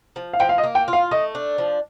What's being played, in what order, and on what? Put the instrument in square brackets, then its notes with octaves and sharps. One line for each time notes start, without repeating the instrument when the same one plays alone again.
[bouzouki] F3
[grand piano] F5
[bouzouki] F3 [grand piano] G5
[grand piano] F5
D#5
[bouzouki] A#3
[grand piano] G5
[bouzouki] F4
[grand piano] F5
[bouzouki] A3 [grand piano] D#5
[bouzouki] D4
F3